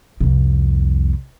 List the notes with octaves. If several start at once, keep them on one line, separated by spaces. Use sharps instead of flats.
C2 F2